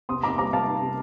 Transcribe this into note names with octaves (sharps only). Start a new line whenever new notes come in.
C3 C6 D#6
D#4 A#5 D6
G3 A#5 D6
C3 F5 A5
D#4
C3